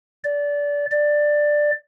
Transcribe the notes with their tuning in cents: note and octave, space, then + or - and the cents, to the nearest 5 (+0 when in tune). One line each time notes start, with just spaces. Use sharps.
D5 -20
D5 +10